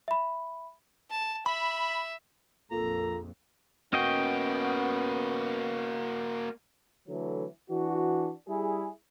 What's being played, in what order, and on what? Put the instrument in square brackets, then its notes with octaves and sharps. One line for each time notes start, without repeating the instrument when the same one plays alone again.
[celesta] E5 B5
[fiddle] A5
[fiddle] E5 [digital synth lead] B5
[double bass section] A#1 F2 [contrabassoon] A#2 [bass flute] A4 [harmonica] A#5
[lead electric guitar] A#3 F#4 [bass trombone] B3 [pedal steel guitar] C#4 D#5 G5
[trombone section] D3 E3 F#3 A3
E3 D4 F#4
G3 E4 G#4